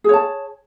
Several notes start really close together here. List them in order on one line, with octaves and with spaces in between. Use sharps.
G#4 C#5 A5